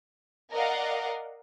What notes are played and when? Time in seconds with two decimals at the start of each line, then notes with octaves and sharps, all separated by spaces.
0.53 A#4 D5 D#5 F5 F#5